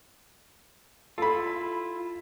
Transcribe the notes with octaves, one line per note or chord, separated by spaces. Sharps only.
E4 F4 A4 B5